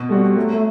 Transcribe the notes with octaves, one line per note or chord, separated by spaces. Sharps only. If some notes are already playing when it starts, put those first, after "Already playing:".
Already playing: B2
G3 A3 C4 F#4
F#3 A3
A3